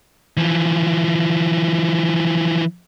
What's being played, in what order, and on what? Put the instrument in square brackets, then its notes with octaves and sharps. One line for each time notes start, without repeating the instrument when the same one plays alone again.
[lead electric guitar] E3 F3